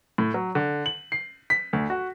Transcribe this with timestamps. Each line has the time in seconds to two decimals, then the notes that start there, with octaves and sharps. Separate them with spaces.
0.18 A2
0.34 F#3
0.55 D3
0.86 F#7
1.12 C7
1.50 B6
1.73 D2
1.90 F#4